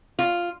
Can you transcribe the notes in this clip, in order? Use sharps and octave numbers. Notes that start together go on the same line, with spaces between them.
F4